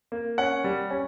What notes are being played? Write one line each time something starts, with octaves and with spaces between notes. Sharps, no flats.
A#3
C#4 F#5
G3
C#4